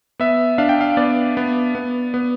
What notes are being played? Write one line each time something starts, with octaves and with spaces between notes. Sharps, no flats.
B3 E5
D4 F5
G5
F5
B3 D5
B3
B3
B3